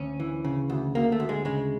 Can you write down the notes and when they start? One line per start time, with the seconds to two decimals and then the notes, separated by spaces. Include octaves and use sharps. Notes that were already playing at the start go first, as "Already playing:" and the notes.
Already playing: D2 C#4
0.20 E3
0.45 C#3
0.70 D2
0.95 D2 A#3
1.12 A3
1.20 D2
1.29 G#3
1.45 C#3 G#3